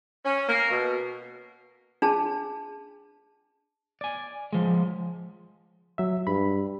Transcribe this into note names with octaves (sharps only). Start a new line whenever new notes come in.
C#4
A#3
B2
D4 G#4 A5
D5 G#5
F3 G#3
F#3 E5
G2 B5